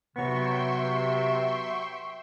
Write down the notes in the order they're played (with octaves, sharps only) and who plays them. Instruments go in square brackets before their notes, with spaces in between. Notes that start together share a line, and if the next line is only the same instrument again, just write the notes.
[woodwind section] C3 [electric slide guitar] F#3 B3 [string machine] E5 G5 C6 [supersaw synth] C#6